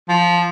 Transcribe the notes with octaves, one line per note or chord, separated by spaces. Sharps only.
F3